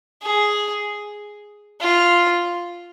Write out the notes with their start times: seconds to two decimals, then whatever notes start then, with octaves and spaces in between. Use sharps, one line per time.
0.23 G#4
1.81 F4